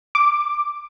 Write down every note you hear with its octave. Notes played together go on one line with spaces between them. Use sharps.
D6